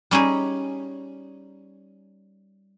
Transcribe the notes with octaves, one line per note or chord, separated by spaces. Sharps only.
G3 C#4 D#4 G#4